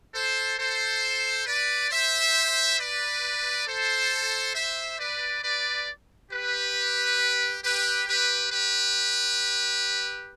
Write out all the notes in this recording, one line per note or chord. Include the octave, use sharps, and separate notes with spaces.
A4 C5
A4 C5
B4 D5
C5 E5
B4 D5
A4 C5
C5 E5
B4 D5
B4 D5
G4 B4
G4 B4
G4 B4
G4 B4